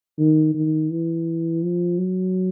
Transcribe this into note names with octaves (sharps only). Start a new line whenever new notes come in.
D#3
D#3
E3
F3
F#3